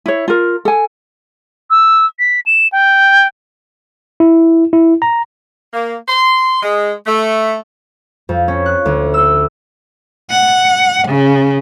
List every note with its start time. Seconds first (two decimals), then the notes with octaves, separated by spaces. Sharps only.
0.06 E4 C#5
0.28 F4 A#4
0.65 A4 G#5
1.70 E6
2.19 B6
2.46 E7
2.72 G5
4.20 E4
4.73 E4
5.02 A#5
5.72 A#3
6.08 C6
6.61 G#3
7.06 A3
8.29 F2
8.48 C#4
8.66 F#6
8.86 D2
9.14 E6
10.30 F#5
11.08 C#3